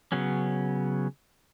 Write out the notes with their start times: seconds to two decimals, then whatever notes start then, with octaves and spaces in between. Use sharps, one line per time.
0.12 C#3 F#3 B3 C#4